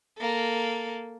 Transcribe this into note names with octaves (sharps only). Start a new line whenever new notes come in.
A#3 A4